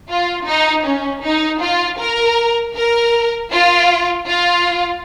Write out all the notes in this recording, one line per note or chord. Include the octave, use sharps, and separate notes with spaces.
F4
D#4
C#4
D#4
F4
A#4
A#4
F4
F4